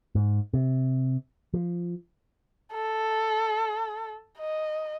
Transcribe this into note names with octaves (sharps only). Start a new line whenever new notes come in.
G#2
C3
F3
A4
D#5